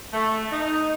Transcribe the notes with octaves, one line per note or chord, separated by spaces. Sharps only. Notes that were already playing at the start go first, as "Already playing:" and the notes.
A3
D#4